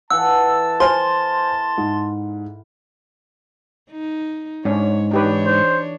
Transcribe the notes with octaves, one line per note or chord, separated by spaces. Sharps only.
E3 A4 F#5 A5 E6
C5 G#5 C6 F6
G#2
D#4
G#2 C#4 D4 C#5
E3 D4 D#4 G4 B4 C#5
C5